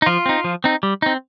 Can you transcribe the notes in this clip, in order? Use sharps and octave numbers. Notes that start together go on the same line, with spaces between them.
D#4
F3 F4
C4 D#4
F3
C4 D#4
G3
C4 D#4